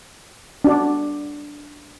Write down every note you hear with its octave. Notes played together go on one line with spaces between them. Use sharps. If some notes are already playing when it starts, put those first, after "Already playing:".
D4 F#4 D5